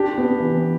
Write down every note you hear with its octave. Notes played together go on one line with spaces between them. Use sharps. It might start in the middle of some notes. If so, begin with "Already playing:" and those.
Already playing: D4 G4
B3
E3